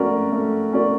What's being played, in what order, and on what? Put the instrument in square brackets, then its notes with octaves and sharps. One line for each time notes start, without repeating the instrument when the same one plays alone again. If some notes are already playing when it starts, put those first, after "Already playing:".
Already playing: [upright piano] A3 C#4 F#4 A#4 D5
A3
C#4 F#4 A#4 D5